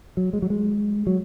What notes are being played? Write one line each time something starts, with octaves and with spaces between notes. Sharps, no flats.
F#3
G#3
F#3
G#3
F#3